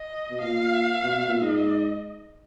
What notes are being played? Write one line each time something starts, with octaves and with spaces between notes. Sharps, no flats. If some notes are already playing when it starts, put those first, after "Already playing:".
Already playing: D#5
B2
A#2 F5
B2
B2
A#2
G#2 D#5